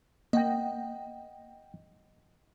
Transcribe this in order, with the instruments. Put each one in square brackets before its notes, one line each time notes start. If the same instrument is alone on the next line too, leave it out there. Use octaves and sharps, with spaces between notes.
[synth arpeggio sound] A#3 [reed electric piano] D#5 F#5 G5